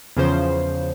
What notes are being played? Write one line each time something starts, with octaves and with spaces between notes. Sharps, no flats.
E2 C#3 F3 C5